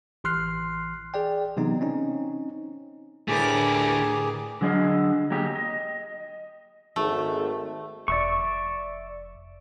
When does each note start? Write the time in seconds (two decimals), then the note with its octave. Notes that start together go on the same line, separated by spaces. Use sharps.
0.24 A1 E3 C6 F6 F#6 C7
1.14 G#4 D5 G5
1.57 C3 E3 F#3 B3 C4 D#4
1.81 C4 C#4 D#4
3.28 A2 D3 A3 G4 G#4 A#4 B4 D6
4.61 D3 F#3 G#4 D#5 F5
5.30 F#3 A#3 G4 G#4
5.55 D#5
6.96 G#1 A3
8.08 F1 D5 E5 C#6